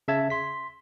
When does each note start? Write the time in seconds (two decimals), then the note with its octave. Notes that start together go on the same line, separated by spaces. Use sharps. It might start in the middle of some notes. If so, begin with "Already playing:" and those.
0.08 C#3 E5 A5 G#6
0.30 C6 B6